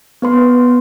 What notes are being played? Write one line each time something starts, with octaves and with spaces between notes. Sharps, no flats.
B3 B4 C6